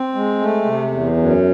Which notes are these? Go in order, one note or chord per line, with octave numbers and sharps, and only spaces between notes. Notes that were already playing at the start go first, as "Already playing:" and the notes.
Already playing: C4
G#3
A3
C3
E2
F#2